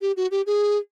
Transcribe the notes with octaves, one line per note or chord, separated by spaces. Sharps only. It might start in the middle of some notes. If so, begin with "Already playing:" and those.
G4
F#4
G4
G#4